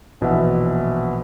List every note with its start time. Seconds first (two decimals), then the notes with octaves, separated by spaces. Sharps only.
0.21 A#1 B2 E3 B4 E5 F#5